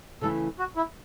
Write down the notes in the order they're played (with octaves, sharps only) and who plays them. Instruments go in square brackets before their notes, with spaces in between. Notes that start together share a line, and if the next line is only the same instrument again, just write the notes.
[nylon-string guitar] C#3 E3 A3 E4 [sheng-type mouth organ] A4
[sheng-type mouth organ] F#4
E4